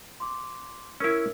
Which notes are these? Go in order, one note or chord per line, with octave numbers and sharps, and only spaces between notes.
C6 D6
C#4 E4 A#4 E6